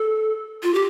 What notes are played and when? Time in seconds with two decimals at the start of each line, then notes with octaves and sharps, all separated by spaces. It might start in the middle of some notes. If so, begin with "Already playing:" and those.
Already playing: A4
0.63 F4
0.74 G4